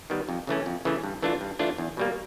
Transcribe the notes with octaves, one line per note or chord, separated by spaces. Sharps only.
D#3 G3 B3
F2
C#3 E3 A3 C#4
F2
C#3 E3 A3 C#4
G2
E3 A3 D4 F4
G2
E3 A3 D4 F4
E2
B2 G3 A#3